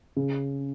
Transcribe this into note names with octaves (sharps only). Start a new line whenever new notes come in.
C#3